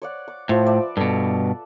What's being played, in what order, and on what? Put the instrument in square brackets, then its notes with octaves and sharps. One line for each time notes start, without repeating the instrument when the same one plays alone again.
[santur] C#5 D5 F#5
D6
[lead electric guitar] A2 [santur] F3 B4 B5
[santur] D5 E5 F#5
[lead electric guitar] G2 B2 [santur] A4